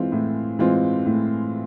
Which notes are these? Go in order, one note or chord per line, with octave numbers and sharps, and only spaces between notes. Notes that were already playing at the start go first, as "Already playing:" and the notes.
Already playing: E3 G#3 C4 F4
A2
E3 G#3 C4 F4
A2